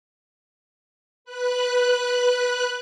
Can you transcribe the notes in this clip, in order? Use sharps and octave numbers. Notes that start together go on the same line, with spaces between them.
B4 F#6